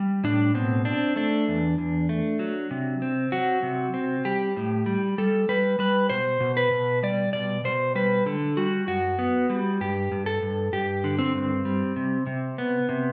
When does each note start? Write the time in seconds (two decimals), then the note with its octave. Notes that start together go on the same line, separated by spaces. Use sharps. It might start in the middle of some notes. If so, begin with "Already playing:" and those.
Already playing: G3
0.24 A2 D4
0.54 B2 C4
0.85 C4 D4
1.16 A3 D4
1.48 E2
1.78 E2
2.09 A3
2.39 F#3
2.71 C3
3.02 C4
3.32 F#3 F#4
3.63 C3
3.94 C4
4.25 G3 G4
4.56 A2
4.86 G3
5.18 G3 A4
5.49 G3 B4
5.79 G3 B4
6.10 B2 C5
6.40 B2
6.57 B4
6.71 B2
7.03 G3 D5
7.33 B2 D5
7.64 B2 C5
7.95 G3 B4
8.26 D3 A4
8.57 G3 F#4
8.87 F#2 F#4
9.19 B3
9.50 G3
9.80 G2 G4
10.12 G2
10.26 A4
10.42 G2
10.72 G2 G4
11.04 D3
11.19 C4
11.35 G2
11.65 G3
11.96 C3
12.27 C3
12.58 B3
12.89 C3